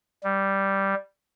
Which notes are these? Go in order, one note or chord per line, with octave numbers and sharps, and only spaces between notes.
G3